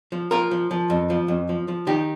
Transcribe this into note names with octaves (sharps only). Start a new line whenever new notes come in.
F3
F3 F4 A#4
F3
F3
F2
F3
F2
F3
F3
D#3 D#4 G4